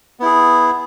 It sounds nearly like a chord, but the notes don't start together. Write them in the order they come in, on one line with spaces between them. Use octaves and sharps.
B3 E4 G#4